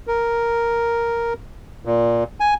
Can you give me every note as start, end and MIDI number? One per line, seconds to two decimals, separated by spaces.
0.07 1.33 70
1.85 2.24 46
2.40 2.54 80